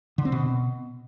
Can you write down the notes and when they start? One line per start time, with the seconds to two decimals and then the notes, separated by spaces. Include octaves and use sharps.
0.18 D3
0.25 C4
0.32 B2